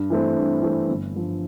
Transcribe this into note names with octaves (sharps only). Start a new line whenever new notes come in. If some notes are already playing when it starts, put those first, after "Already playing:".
Already playing: G2
E3 A3 C4
G2
E3 A3 C4
G1
G2 D3 F3